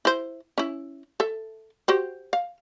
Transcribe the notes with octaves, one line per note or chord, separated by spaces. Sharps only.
E4 C5
C#4 E4
A4 E5
F#4 G4 C5
F5